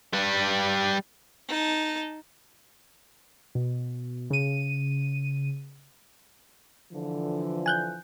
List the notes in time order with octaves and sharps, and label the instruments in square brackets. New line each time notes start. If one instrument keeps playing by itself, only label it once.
[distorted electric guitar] G3 B4
[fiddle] D#4 A5
[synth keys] B2
C#3 D#7
[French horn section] D3 E3 F3
[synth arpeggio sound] G#5 F#6 G6